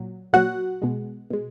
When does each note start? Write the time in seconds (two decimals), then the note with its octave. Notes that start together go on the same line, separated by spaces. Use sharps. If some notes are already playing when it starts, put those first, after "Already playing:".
Already playing: A#2 F#3
0.33 A#2 F#3 F#4 F#5
0.82 B2 G#3
1.31 B2 G#3